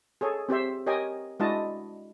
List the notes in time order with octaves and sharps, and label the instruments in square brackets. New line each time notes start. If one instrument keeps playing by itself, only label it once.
[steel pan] G#4 A4 C#5
C4 G4 C5 E5
G4 A#4 C#5 D#5 G5 G#5
G#3 D4 E4 F#4 D#5 A5